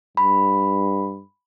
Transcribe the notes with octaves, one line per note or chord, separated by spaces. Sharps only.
G2 B5